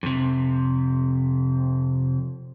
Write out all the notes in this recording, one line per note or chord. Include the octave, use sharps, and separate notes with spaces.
F2 C3